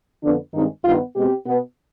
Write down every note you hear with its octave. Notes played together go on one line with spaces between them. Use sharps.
F2 D3 F3 B3 D4
G2 D#3 G#3 C4 D#4
G2 D#3 B3 F4
B2 G#3 C4 G4
B2 B3